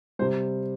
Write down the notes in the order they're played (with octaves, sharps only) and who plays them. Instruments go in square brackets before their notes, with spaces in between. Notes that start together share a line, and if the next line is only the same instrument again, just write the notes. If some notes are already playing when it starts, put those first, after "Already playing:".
[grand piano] C3 G3 C5